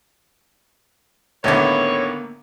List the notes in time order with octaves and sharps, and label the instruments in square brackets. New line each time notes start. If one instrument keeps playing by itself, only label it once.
[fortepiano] A1 D3 [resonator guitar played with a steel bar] D#3 E4 [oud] A#3 B3 [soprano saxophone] C#5